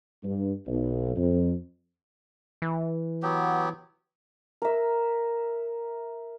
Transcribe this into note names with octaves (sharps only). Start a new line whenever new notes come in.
G2
B1
F2
E3
F#3 B3 G4
A#4 E5